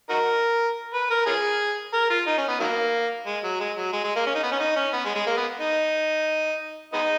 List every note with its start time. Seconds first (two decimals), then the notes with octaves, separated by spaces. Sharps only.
0.09 D#4 F#4 A#4
0.94 B4
1.10 A#4
1.27 C#4 F4 G#4
1.93 A#4
2.10 F4
2.27 D#4
2.37 C#4
2.48 B3
2.60 D#3 F#3 A#3
3.26 G#3
3.44 F#3
3.60 G#3
3.77 F#3
3.93 G#3
4.04 G#3
4.16 A#3
4.27 C#4
4.35 D#4
4.43 B3
4.52 C#4
4.60 D#4
4.76 C#4
4.93 B3
5.05 G#3
5.15 G#3
5.27 A#3
5.37 B3
5.60 D#4
6.93 G#3 B3 D#4